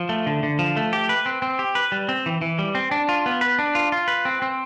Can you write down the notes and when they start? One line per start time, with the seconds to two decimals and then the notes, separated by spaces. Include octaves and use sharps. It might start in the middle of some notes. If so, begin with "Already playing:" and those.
Already playing: F3
0.09 A3
0.26 D3
0.43 D3
0.59 F3
0.77 A3
0.93 G4
1.09 B4
1.26 C4
1.42 C4
1.59 G4
1.75 B4
1.92 G3
2.09 C4
2.26 E3
2.41 E3
2.59 G3
2.75 C4
2.91 D4
3.09 F4
3.26 B3
3.41 B4
3.59 D4
3.75 F4
3.92 F4
4.08 B4
4.25 C4
4.42 C4